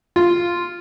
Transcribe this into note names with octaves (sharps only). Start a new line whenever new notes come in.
F4